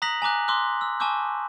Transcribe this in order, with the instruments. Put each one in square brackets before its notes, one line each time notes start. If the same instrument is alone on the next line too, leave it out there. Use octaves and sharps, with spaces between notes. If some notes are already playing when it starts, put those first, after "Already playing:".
[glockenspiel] A#5 D#6 F#6 A#6 B6 F#7
G#5 A#5 D6 F#6
C6 D6 E6 F#6
E6
G#5 A5 C#6 D6 E6 G6